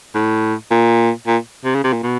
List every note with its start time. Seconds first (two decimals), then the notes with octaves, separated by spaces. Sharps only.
0.15 A2
0.70 A#2
1.27 A#2
1.64 C3
1.74 C#3
1.84 C3
1.93 A#2
2.03 B2